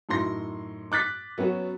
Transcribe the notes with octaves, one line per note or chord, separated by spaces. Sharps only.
F#2 A2 D#4 C6 A#6
D6 F#6 A6 B6
F#3 B3 C#4 F#4